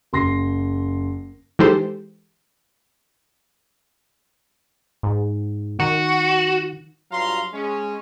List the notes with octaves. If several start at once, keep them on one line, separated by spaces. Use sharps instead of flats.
F#1 C6 A#6 C7
E3 G#3 D#4 G4 A4 C5
G#2
D#3 F#4
G2 F#3 F4 F5 A#5 C6
G#3 C#4